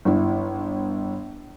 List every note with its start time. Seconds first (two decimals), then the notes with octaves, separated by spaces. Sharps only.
0.05 G1 E4